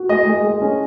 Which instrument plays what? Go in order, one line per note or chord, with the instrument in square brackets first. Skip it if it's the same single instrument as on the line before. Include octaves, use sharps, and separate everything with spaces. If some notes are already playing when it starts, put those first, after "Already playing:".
Already playing: [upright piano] F#4
[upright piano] G#3 [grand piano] D#5
[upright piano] G#3
G#3
C#4